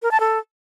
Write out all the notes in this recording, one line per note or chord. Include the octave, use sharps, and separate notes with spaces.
A#4
A5
A4